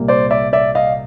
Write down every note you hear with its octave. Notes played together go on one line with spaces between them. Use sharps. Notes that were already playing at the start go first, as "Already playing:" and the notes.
Already playing: C2 A#2 G3 A#3
C5 D5
D5 E5
D5 E5
D#5 F5